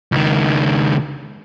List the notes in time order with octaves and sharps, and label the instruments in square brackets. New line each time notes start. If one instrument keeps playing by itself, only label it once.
[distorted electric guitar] C#2 D#3